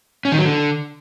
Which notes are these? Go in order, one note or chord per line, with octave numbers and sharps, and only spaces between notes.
C#4
D#3
F#3
D3